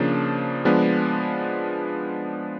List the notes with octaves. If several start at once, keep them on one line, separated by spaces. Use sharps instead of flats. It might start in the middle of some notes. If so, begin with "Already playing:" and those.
Already playing: C#3 F3 A#3 D4
F3 G#3 B3 D4